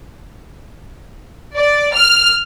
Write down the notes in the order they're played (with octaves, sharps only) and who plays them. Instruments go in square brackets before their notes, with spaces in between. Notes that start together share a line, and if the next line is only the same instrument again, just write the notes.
[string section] D5
F6